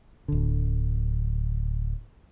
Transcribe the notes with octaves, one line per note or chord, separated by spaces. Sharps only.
D1 D3